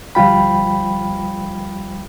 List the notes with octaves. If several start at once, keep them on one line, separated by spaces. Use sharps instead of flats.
D2 F3 G3 F4 G5 B5